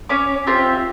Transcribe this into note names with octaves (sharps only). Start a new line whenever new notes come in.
C#4 C#5 D6
C4 F4 G4 E5